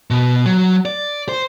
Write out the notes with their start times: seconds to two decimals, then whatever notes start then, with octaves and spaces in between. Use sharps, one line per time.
0.10 B2
0.46 F#3
0.85 D5
1.29 C5